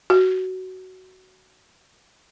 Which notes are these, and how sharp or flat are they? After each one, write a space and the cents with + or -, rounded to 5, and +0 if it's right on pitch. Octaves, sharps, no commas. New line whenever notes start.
F#4 +15